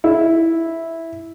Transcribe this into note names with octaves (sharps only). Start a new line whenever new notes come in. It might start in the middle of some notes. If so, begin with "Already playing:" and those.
E4